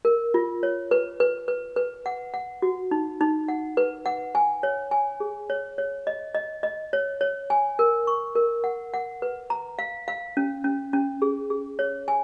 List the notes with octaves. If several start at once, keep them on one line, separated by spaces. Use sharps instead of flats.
A#4
F4
C#5
B4
B4
B4
B4
F#5
F#5
F#4
D#4
D#4
F#5
B4
F#5
G#5
C#5
G#5
G#4
C#5
C#5
D#5
D#5
D#5
C#5
C#5
G#5
A#4
C#6
A#4
F#5
F#5
B4
A#5
F5
F5
C#4
C#4
C#4
G#4
G#4
C#5
G#5